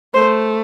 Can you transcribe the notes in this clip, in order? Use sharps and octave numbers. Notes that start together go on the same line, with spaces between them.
A3 C5